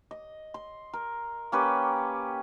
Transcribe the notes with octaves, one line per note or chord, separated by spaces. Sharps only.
D#5
C6
A#4
A#3 C#4 G4 B4